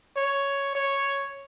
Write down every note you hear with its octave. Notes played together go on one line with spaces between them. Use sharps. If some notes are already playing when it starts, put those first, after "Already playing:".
C#5
C#5